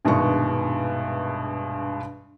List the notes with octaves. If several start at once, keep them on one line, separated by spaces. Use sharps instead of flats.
A#1 G2 B2 D#3 G#3 C#6